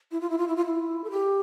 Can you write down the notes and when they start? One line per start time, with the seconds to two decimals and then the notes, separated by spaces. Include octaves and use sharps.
0.12 E4
0.21 F4
0.30 E4
0.38 F4
0.48 E4
0.56 F4
0.65 E4
1.04 A4
1.11 G4